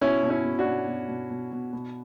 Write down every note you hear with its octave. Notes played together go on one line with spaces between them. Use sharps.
B2 C#4 E4
B2
C#4 E4
B2
D4 F#4
B2
B2
B2
B2
B2
B2